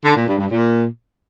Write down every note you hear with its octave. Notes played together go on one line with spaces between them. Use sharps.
D3
A#2
G2
G2
A#2